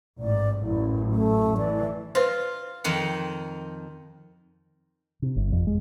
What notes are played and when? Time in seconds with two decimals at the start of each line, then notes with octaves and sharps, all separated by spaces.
0.19 A1 G#2 D5
0.62 A1 F#2 E4
1.12 A3
1.58 E3 D5
2.15 F4 B4 C5
2.84 F2 D#3 F#5
5.22 C3
5.36 G1
5.52 F2
5.67 G#3